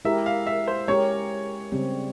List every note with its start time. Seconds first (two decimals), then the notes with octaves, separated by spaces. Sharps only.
0.05 G#3 E4 G4 A#4 E5
0.26 F5
0.47 E5
0.68 C5
0.88 G#3 C#4 G4 A#4 C#5
1.72 C#3 G3 C4